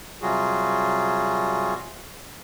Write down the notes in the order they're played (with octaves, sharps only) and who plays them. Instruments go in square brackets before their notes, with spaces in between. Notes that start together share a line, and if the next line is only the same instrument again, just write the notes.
[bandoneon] C3 F#3 G3 F4 F#4 G#4